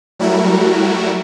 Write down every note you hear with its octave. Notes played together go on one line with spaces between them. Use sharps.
F#3 G3 A3 E4 F#4 A#4